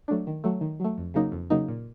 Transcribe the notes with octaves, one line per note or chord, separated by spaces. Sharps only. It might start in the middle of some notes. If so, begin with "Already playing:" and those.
F#3 A3 D4
D#3
F#3 A3
D#3
F#3 A3
F2
C#3 F#3 A#3 D#4
F2
C#3 F#3 A#3 D#4
A#2